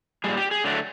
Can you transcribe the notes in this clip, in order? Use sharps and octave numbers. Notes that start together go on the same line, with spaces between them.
A#2 G3 G#4
G4
G#4
D3 F#3 A3